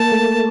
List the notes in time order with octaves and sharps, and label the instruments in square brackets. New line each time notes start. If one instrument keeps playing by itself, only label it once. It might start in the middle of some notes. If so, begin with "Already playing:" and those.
Already playing: [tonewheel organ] A#3 [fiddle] A5
[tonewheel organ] A3